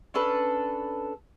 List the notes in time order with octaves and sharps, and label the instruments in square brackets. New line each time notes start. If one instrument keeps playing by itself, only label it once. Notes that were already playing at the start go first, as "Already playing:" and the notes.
[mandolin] C#4 D4 A4 B4